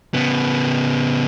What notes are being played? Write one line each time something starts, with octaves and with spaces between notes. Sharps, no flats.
C#3 B3